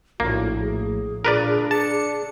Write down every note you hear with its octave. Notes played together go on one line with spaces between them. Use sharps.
A#1 A2 A#3 F#4
G#4
A#2 D4 A#4 B4 D5
A5 C#7